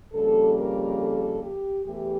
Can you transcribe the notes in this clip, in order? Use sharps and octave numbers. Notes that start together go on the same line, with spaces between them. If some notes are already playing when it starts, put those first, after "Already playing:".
F2 C#3 G3 A#3 A4
A#4
A4
G4
E2 E3 A3 G4